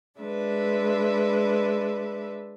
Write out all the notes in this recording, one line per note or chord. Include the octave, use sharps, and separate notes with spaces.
G#3 D4 B4 E5